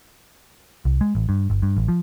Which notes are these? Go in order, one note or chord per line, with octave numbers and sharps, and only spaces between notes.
C2
G#3
A1
G2
G1
G2
A1
F3